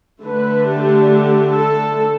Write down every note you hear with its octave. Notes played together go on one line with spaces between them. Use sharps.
D3 A3 D4 B4
G4
G4
A4